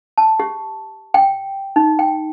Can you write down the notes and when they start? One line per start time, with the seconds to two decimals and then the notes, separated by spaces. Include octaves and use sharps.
0.18 A5
0.40 G4
1.14 G5
1.76 D#4
1.99 G5